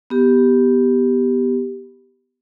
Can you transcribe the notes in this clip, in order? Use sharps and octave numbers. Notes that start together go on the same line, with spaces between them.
B3 G4